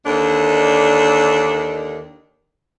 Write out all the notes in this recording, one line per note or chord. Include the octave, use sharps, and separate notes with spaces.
D#2 D3 D#3 D4